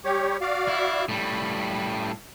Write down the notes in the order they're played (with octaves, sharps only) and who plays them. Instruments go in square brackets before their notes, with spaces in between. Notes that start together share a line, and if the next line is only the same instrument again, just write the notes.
[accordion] G3 G4 C#5
F#4 D5 F5
[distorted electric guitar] E4
[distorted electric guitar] A2 G3 [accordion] B5